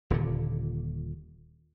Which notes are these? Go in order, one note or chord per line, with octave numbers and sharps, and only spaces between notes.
D#1 A#2 D3